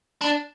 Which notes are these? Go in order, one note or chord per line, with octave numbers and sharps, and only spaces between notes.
D4